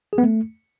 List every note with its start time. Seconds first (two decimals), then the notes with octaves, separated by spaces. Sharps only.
0.13 G#4
0.18 B3
0.23 A3